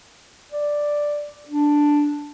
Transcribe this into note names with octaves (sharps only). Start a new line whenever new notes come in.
D5
D4